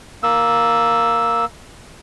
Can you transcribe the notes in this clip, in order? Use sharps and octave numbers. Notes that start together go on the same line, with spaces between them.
A#3 E6